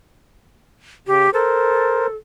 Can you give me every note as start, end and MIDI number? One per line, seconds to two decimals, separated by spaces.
1.07 1.27 49
1.07 1.30 67
1.33 2.16 69
1.33 2.07 70
1.33 2.07 72